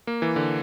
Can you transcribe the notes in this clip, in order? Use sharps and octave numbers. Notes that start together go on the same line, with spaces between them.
A#3
E3
D3